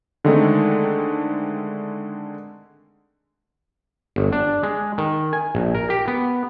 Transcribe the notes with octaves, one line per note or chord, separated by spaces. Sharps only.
D3 D#3 G#3 A3 C4 D#4
G1
D4
G#3
D#3
G#5
A#1
A#4
G4
B3